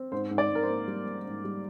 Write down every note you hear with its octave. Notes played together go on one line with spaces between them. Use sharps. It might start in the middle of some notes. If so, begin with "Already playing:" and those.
Already playing: C4
G#2 C5
G#2
D5
G#2
A#4
C5
A#3
G3
A#3
G#2
G3